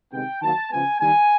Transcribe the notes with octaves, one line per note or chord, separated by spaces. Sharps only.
C3 D#3 G#3 B3 G5
D#3 F#3 A#3 A5
C#3 F3 G#3 B3 G#5
D#3 G3 A#3 G#5